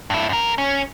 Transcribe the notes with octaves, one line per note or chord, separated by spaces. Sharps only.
G2 E4
F#2 A#4
C#4